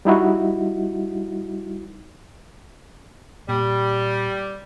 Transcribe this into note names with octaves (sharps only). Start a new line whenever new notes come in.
G3 D#4 E4 F#4
A#2 G3